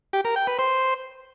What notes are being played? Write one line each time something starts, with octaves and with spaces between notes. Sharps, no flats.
G4
A#4
G5
B4
C5